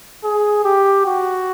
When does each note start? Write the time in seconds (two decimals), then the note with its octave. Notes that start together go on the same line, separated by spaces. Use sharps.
0.24 G#4
0.64 G4
1.06 F#4